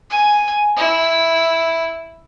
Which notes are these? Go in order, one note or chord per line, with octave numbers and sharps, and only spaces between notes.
G#5
E4